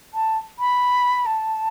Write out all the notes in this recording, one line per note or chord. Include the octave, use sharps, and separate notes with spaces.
A5
B5
A5